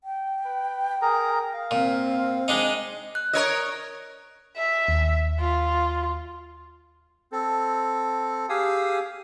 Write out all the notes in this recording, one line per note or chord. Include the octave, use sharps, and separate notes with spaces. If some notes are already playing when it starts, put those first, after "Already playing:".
G5
B4
G#4 A#4 A#5
F5
A#2 C4
G#3 D4 D#4
F#6
A#4 C#5 D#5
E5
D#2
F4
C4 A4
G4 G#4 F5 G#5 D#6 E6